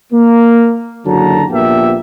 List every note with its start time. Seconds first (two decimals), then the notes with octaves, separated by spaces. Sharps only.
0.12 A#3
1.05 F#1 D3 F#3 A5 A#5
1.50 A#1 A#2 B3 G4 E5